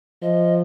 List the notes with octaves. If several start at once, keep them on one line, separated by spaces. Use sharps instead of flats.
F3 D#5